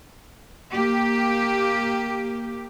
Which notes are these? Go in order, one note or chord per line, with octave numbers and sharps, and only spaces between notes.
A#3 G4